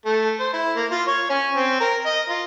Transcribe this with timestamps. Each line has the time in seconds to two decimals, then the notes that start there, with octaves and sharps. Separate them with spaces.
0.05 A3
0.39 C5
0.53 E4
0.77 A#3
0.91 F4
1.07 C#5
1.30 C#4
1.54 C4
1.80 A#4
2.06 D#5
2.29 F4